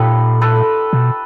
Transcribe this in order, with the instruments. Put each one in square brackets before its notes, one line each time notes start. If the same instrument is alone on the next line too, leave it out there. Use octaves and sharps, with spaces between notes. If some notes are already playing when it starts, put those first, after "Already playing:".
Already playing: [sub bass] A#2 [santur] D#4 F4 G4 A4 B4
[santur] A4 B4
[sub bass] B2